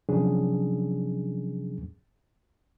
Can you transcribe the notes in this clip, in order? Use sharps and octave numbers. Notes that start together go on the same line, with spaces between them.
C3 F3 F#3 C#4 D4 G#4